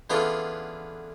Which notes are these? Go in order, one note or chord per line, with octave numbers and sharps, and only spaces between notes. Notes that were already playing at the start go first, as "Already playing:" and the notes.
D3 E3 B3 C#4 F4 G#4